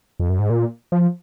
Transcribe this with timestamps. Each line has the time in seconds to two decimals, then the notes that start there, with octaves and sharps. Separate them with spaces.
0.20 F2
0.30 F#2
0.39 G#2
0.50 A#2
0.92 F3